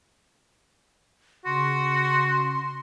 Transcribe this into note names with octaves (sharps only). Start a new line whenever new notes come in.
C#3 F#4 C6